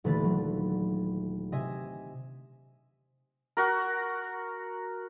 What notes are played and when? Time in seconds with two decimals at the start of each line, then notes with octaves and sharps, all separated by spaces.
0.04 D#1 D3 E3 A3 B5 A6
0.24 F#3
1.52 C3 D#5 E5 G#5
3.57 F#4 A#4